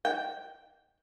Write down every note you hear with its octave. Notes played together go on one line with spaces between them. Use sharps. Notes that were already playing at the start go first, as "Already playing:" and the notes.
G5